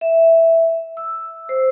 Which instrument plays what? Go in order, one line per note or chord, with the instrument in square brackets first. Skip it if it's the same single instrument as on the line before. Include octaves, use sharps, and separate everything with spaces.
[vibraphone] E5
E6
C5